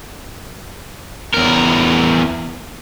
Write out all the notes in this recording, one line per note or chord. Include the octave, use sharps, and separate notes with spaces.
E2 A#4